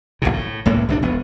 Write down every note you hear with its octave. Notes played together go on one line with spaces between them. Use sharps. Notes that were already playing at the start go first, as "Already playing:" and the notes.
F#1 B1 A2 C3
A2
C#2 A2 C#3 A#3
G1 C2 D4
E1 B3